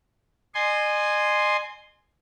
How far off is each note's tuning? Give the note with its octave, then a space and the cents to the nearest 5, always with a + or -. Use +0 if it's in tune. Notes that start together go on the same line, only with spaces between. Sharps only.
D#5 -40 G#5 +0 C6 +0